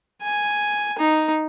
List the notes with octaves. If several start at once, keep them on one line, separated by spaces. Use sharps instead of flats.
G#5
D#4